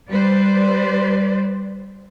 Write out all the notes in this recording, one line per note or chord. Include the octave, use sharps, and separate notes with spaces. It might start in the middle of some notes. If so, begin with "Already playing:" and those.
G3 B4 C5 D5